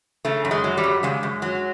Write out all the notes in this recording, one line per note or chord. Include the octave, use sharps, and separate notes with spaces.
C#3 A3
F#2
G#3
F#3
G3
F#2
C#3 G#3
F#2
F#3